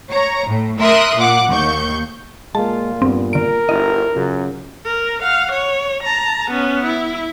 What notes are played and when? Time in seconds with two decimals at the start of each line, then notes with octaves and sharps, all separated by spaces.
0.10 C#5 A#5
0.47 A2
0.79 A#4 E5 C6 D#6 F#6
1.17 A#2 F#5 D6 F#6
1.49 D#2 C#6 G6
2.55 A#2 G#3 A#3 F4 A5
3.02 G2 B3 C4
3.33 D3 A#4 D7
3.69 G1 E4 D#5
4.15 F#2 C#3 F4
4.85 A#4
5.22 F5 F#5
5.52 C#5
6.04 A5 A#5
6.51 B3 C#4
6.85 E4